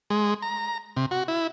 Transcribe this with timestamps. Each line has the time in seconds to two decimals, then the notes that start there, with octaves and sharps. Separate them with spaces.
0.10 G#3
0.42 A#5
0.97 C3
1.11 F#4
1.28 E4